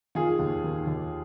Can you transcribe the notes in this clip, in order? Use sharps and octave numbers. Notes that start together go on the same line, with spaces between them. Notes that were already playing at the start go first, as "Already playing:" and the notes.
D#3 F4 G#4
D#2
D#3
D#2